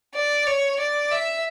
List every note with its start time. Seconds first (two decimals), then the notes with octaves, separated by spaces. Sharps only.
0.14 D5
0.47 C#5
0.80 D5
1.11 E5